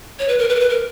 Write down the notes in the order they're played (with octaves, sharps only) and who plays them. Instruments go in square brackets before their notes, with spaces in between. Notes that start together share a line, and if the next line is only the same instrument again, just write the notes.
[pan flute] C#5
B4
A#4
B4
A#4
B4
A#4